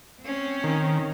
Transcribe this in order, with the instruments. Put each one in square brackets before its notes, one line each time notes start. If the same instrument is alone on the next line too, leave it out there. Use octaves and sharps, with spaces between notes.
[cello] C4 C#4
[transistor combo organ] D#3